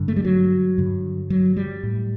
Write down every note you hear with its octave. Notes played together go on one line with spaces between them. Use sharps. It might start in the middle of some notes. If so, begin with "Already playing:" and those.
Already playing: G2 D3
A3
G3
F#3
G2 D3
F#3
G3
A2